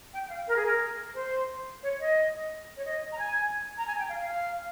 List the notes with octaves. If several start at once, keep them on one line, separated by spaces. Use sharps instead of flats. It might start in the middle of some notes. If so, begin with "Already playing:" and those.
G5
G5
F5
A#4
G#4
A#4
C5
C#5
D#5
C#5
D#5
A#5
G#5
A#5
G#5
G5
F5
F5